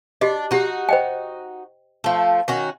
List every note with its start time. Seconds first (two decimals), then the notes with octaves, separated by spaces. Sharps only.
0.21 D4 F#4 G4 D#5
0.51 D#4 F#4 G4 C#6
0.89 C5 D#5 G5
2.04 F3 A3
2.48 D#3 C#4 F#4